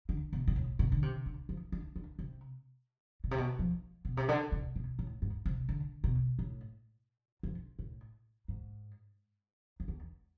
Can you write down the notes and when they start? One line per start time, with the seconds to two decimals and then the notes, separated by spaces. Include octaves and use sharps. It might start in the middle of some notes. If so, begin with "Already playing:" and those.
0.09 D3
0.33 B2
0.47 B2
0.56 A2
0.79 B2
0.92 D3
1.02 C3
1.26 D3
1.49 F3
1.72 D3
1.96 D3
2.19 C3
3.24 B2
3.31 C3
3.38 B2
3.59 F3
4.05 B2
4.17 C3
4.28 D3
4.52 C3
4.76 B2
4.99 A2
5.22 G#2
5.46 C3
5.69 D3
6.04 B2
6.39 A2
7.43 F2
7.79 A2
8.48 G#2
9.80 F2
9.88 E2